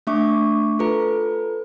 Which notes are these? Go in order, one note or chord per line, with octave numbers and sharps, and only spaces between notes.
A3 D4 E5 C#6 D6
F4 A4 B4 A#5